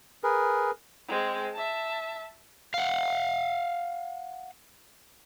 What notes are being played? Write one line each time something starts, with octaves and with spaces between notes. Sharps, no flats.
G#4 A#4 B4
G#3 C4
E5 A5
F5 F#5